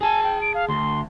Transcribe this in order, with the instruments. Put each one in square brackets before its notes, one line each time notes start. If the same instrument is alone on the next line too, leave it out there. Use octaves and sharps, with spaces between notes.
[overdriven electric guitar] G#4 A5 [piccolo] G#5
[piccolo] G5
D7
F5
[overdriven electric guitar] D2 [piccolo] C6